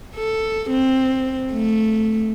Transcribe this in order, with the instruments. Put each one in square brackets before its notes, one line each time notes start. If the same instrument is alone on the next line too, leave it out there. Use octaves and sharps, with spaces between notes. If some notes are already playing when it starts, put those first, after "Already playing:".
[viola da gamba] A4
C4
A3